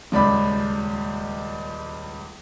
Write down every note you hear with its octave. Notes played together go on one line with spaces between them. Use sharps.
D#1 C#2 D5 B5